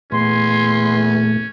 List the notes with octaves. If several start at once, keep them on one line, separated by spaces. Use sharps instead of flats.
E2 A#2 A3 C#4 C6